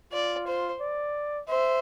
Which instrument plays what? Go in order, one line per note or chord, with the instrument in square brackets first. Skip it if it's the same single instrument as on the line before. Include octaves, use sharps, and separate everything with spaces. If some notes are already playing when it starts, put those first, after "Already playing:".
[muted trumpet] F4 [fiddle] D5
[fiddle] C5
[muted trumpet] D5
[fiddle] C5 [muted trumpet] E5